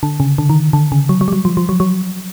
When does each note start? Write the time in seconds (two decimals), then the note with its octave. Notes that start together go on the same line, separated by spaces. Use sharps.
0.03 D3
0.20 C#3
0.38 D3
0.50 D#3
0.73 D3
0.92 C#3
1.09 F#3
1.21 F#3
1.28 G3
1.33 F#3
1.45 F3
1.57 F3
1.69 F#3
1.80 F#3